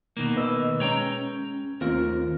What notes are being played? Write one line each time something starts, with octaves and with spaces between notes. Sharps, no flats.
B2 D#3 A#3
B4 D#5 E6
G#3 C#4 C#5 G5 A#5
D#2 A3 C4 F4 A#4